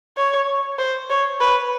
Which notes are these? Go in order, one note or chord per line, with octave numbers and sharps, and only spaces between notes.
C#5
C5
C#5
B4